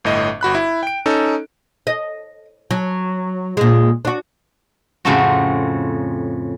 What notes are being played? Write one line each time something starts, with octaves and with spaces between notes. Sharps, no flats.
G1 A2 D#5
G1 F#4 B5 F#6
E4
G5 D7
C#4 D#4 A4
D#5
F#3
A#2 G#3
D4 F#4
F2 A2 C#3 A3 C4 F#4